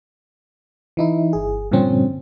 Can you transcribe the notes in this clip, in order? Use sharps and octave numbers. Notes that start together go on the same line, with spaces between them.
E3 D#4 E4
G1 G#4
G2 A#2 D3 F3 C4 C#4